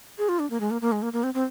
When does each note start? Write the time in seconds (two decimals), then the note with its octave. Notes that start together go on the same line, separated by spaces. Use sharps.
0.18 G#4
0.29 F4
0.39 D4
0.50 A#3
0.60 G#3
0.71 A#3
0.81 A#3
0.92 G#3
1.02 A#3
1.13 A#3
1.24 C4
1.34 C4